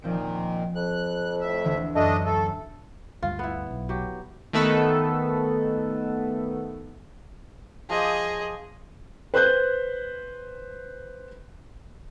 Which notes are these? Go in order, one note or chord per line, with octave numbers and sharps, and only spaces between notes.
A#2 D#3 F3 C4 D7
F2 F#6
A2 E5
D2 D3 E3
F#2 A3 D4 D#5
A3 A4
D2 G2 F4
B3 E4
B1
F#3 G4
D#3 A3 B3 A4 B4
F3 G#4 C5 D#5 D6
B4 C5 F#6 G6